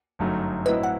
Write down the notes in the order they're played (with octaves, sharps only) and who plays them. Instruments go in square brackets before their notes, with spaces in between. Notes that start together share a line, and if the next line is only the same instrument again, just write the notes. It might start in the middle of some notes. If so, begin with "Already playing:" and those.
[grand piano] G1 F#2 F#3 A3 D#4
[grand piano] A2 F#3 C4 E4 [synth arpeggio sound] B4 D#5
[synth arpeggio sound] F#5